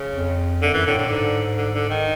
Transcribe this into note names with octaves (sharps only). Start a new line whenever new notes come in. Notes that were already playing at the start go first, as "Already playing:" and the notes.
Already playing: C#3
F2
F#2 D3
E3
A2 D3
D3
G#2
D3
D3
D#3